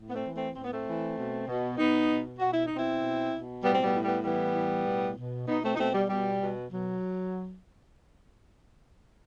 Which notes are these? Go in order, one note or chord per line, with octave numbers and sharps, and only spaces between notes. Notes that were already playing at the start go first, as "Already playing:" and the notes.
Already playing: A2
B3
A3 C4
E3
A3 C4
A2 C4
B3
A3 C4
E3
B2
B2
B2 B3 D#4
B2
B2 F#4
E4
D#4
B2
C4 E4
B2
B2
A2 G3 B3
C4
G3 B3
A2
G3 B3
E3 G3 B3
A2
B2
B2
B2 B3 D#4
A3 C4
D#4
B2 A3 C4
G3
B2 G3
B2
B2 F#3